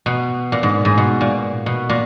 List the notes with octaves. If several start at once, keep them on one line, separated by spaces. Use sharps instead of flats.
B2
A#2
G#2
G#2
B2
A#2
B2
A#2